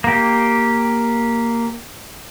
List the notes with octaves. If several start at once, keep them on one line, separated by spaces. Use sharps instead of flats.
A#3 G4